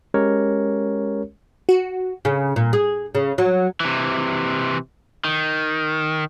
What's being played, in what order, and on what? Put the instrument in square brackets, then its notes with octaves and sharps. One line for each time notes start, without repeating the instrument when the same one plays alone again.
[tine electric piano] G#3 C#4 G4 A#4 C#5
[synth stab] F#4
[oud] C#3
A#2
G#4
C#3
F#3
[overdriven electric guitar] C3 E3
D#3